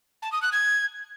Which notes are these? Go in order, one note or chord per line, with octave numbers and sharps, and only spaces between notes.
A5
D#6
F#6
G#6